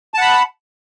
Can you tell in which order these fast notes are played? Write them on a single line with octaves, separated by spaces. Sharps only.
A5 F#5 B5